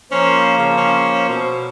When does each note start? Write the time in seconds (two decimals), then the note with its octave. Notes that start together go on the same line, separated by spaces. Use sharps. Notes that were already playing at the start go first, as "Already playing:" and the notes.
0.12 F3 A#3 C#4 C5
0.58 C#3
0.77 C#4
1.29 B2